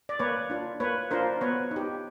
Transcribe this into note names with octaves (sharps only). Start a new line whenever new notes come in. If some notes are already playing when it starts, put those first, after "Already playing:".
D5
A#3 B4 C#5
D4 F4
A#3 B4 C#5
D4 F4 A#4 C5
B3 B4 C#5
D#4
G4